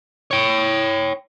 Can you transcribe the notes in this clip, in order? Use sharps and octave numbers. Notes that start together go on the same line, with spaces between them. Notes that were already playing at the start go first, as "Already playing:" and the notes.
C#5 G5